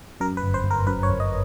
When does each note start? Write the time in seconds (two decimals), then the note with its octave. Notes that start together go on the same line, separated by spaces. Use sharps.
0.20 F#2 A#4
0.37 B4
0.42 G1
0.54 C5
0.64 G1
0.71 A#4
0.87 F#2 B4
1.03 C#5
1.09 G1
1.20 D#5